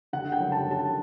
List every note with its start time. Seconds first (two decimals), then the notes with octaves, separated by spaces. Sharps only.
0.13 D3 F#5
0.32 G5
0.39 F#1
0.52 A5
0.65 F#2
0.71 A5